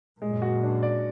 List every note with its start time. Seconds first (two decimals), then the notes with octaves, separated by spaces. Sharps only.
0.21 F#2 A#2 G#3
0.42 F#4
0.63 D4
0.83 D5